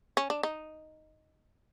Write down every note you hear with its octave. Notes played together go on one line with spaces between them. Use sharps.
C#4
D4
D#4